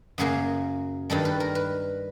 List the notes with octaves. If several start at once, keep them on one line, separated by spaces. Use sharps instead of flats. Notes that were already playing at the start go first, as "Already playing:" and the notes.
F#2 C#3 F#3 A#3 G#4
G2 D#3 G3 A4
B4
A#4
B4